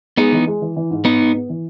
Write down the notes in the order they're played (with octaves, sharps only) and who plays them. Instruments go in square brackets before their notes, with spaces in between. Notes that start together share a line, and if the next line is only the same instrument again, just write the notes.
[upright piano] G#3 [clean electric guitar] B3 D#4
[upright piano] E3
G#3
E3
E3
G#2
[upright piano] G#2 [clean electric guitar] B3 D#4
[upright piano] G#2
B3
E3